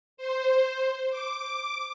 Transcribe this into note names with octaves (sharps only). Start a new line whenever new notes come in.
C5
D6